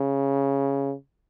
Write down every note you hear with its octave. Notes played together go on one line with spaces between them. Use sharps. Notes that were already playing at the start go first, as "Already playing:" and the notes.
Already playing: C#3